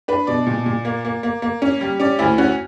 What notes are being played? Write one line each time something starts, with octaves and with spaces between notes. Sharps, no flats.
D4 B4
B2 D5
A#2
A#2
A#3
A#3
A#3
A#3
C#4
G3
C#4 D5
D2 E4
C#4 F#4